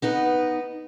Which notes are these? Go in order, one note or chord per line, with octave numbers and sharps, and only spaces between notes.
B3 D#4 B4